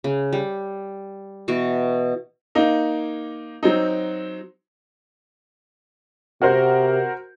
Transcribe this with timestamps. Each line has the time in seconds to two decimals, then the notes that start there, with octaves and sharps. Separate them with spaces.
0.04 C#3
0.33 G3
1.48 B2 E3 F#4 C#6
2.55 A#3 D#4
3.63 F#3 C4 D#4
6.42 C3 F#4 A#4 C5